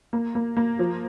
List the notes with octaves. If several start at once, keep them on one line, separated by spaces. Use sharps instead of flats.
A#3
A#3
A#3
F3